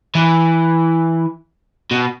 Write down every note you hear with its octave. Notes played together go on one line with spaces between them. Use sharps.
E3
B2